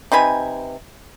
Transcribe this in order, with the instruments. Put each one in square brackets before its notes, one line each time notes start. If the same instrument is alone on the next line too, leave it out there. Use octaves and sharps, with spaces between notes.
[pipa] C3 D#4 B4 G#5